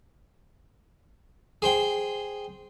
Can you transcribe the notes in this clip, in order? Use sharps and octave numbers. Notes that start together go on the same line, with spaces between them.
G#4 C5 G5